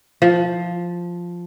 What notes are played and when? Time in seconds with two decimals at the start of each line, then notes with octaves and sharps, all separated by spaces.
0.22 F3